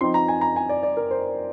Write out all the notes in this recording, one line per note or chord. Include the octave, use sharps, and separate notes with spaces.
F3 C4 D#4 C6
A#5
G#5
A#5
G#5
D5
D5
A#4
C5